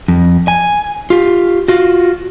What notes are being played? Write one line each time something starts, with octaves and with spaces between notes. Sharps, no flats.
F2
G#5
F4 G4
F4 F#4